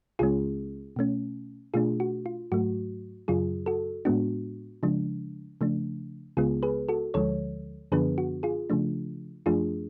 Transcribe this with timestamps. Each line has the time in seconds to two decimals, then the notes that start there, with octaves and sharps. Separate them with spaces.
0.19 C#2 C#3 G#3 C#4 F4 G#4
0.96 B2 A3 C#4
1.74 B2 A3 D4 F4 G#4
2.00 F#4
2.26 F4
2.52 G#2 F#3 A3 F#4
3.28 F#2 C#3 F#3 F4 G#4
3.66 F#4 A4
4.05 A2 G#3 B3 D4 F#4
4.83 C#3 F3 G#3 D4
5.61 C#3 F3 A3 D4
6.37 C#2 C#3 G#3 B3 F4 G#4
6.63 G#4 B4
6.89 F#4 A4
7.14 D2 D3 F3 G#3 A4 C#5
7.92 F#2 D3 F3 B3 D4 G#4 B4
8.18 F#4
8.43 F4 G#4
8.70 C#3 F3 A3 D4
9.46 F#2 F3 A3 D4 F4 G#4